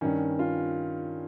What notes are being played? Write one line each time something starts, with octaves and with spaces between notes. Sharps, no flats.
G2 D#3 C#4
F4